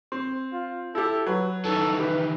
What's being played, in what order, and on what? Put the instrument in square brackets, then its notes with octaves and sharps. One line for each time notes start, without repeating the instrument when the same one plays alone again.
[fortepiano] C4
[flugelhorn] F4
[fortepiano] E4 G4 [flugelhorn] A4
[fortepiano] F#3 [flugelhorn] B4
[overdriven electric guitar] D#3 E3 [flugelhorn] A4
[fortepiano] G4 [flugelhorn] B4